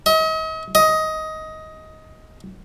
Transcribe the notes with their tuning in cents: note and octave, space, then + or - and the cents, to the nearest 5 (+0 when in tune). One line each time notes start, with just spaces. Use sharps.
D#5 +40
D#5 +15